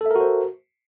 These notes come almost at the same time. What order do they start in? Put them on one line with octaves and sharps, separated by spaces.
A4 E5 A#4 F#4 C5